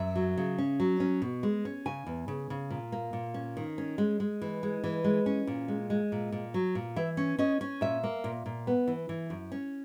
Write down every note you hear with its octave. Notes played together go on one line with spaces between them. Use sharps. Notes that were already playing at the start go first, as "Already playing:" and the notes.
Already playing: F#2 E5
F#3
C#3
C#4
F#3
C#4
B2
G#3
C#4
C#3 G#5
E2
C#3
C#3
A#2
A#3
A#2
C#4
D#3
C#4
G#3
G#3
E3
G#3
E3
G#3
C#4
A#2
G#3
G#3
A#2
A#2
F#3
A#2
E3 E5
C#4
C#4 D#5
C#4
A#2 E5
A#3
A#2
A#2
B3
E3
E3
F#2
C#4